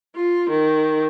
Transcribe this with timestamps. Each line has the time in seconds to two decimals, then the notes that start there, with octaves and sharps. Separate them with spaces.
0.16 F4
0.50 D#3